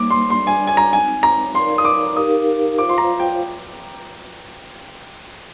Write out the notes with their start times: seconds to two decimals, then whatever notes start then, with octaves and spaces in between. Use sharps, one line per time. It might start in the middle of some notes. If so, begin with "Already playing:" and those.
Already playing: G3 A#3 D#4 D6
0.11 C6
0.30 G3 D4 G#4 D5 C6
0.47 G#5
0.67 G#5
0.77 A#5
0.93 G#3 C4 D#4 G#5
1.23 A#5
1.55 D#4 A#4 D5 F5 C6
1.78 D#6
1.85 D6
2.16 D#4 G4 A#4 F5 D#6
2.78 F4 C5 F5 D6
2.89 C6
2.98 A#5
3.20 G5